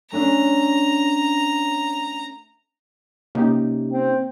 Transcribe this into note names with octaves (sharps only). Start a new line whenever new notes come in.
A3 C#4 D4 A#5
C3 A#3 C#4 D#4 G4
C4